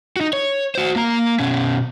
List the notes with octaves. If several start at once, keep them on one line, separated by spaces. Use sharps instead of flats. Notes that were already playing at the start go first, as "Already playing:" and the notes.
D#4 F#4
C#5
F#4 C5
A#3 A#5
B2 C#4